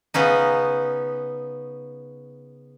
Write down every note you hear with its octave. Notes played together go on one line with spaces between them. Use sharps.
C#3 B3 C#4 D#4